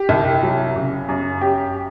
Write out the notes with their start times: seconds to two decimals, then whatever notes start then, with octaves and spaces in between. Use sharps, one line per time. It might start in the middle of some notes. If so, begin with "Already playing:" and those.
Already playing: G4
0.09 C2
0.43 F#3
0.76 C#3
1.09 F#2
1.41 F#2 G4